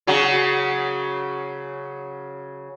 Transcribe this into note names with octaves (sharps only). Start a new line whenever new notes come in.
C#3 F#3 F#4